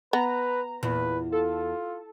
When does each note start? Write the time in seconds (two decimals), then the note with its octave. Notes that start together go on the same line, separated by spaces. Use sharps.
0.13 B3 B4 A#5
0.83 E2 A#2 B4
1.32 F4 A4